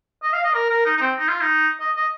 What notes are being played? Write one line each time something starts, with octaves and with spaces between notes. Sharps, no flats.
D#5
F5
D#5
A#4
A#4
D#4
D#4
C4
D#4
F4
D#4
D#5
D#5